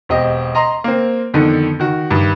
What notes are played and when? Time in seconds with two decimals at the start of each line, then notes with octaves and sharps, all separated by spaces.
0.09 E1 C4 G4 D#5
0.55 D#5 A#5 C6
0.84 A#3 C4
1.34 F2 D3 D#3 B3
1.80 D#3 F#4
2.10 G2 D#3